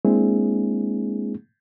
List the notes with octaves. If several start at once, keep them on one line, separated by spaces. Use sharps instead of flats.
G#3 A#3 C4 D4 E4 G#4